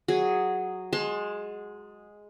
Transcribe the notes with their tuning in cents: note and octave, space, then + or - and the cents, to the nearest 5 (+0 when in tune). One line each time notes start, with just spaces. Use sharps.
F#3 +0 G#4 +0
G#3 +0 A5 +15 C6 +25